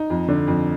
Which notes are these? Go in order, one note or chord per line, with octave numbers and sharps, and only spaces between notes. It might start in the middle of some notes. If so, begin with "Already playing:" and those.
Already playing: D#4
F2
D3
F2